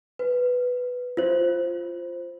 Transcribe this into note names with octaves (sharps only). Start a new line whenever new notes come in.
B4
F4 C5